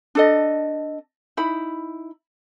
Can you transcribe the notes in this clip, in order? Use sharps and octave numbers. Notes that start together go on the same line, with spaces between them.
D4 A4 D#5
D#4 E4 B5